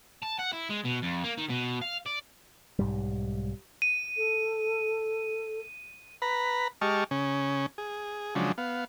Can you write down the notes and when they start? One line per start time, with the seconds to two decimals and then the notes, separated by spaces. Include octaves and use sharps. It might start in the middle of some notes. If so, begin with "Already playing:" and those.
0.22 A5
0.39 F#5
0.53 E4
0.70 G#3
0.85 B2
1.03 F2
1.24 A#3
1.38 D#3
1.49 B2
1.81 F5
2.06 D5
2.79 B1 G#2 G3
3.82 D#7
4.17 A4
6.22 B4 A#5 B5
6.81 G#3 G4 D#5 A5 C#6 F6
7.11 C#3 C#4
7.78 G#4
8.35 C#3 F3 F#3 G#3 D4
8.58 B3 F5